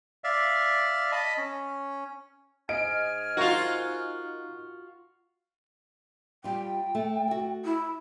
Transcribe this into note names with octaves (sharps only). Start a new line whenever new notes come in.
D5 E5 F5
D#5 A5 B5
C#4
G#2 D#5 G#5 F6 D7
D#4 F4 F#4 A#4 F5
G3 F4 G5
A3
F#4 A4
E4